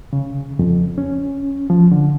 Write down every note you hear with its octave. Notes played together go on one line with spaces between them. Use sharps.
C#3
F2
C#4
F3
D3